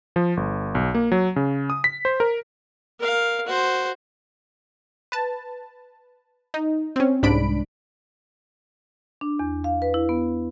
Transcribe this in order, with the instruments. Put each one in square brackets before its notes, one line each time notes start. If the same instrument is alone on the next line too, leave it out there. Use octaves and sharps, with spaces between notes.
[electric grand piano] F3
G1
B1
A#3
F#3
C#3
D#6
B6
C5
A#4
[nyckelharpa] A#4 F5
F#4 C5
[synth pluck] B4 A5
D#4
C4 C#4
C2 G#2 D4 B5 D7
[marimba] D4
E2
F5
B4
E4
B3